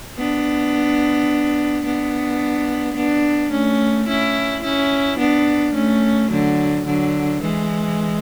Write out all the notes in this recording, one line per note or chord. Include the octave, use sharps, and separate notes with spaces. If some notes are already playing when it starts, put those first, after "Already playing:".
B3 D4
B3 D4
B3 D4
A3 C#4
C#4 E4
C#4 E4
B3 D4
A3 C#4
D3 F#3
D3 F#3
E3 G#3